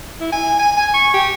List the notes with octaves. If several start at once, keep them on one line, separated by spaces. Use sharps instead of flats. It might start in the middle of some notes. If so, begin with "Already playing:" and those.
E4
G#5
G#5
G#5
C#6
G4